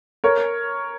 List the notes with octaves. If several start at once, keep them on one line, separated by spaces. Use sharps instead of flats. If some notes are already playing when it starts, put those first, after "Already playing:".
A#4 C#5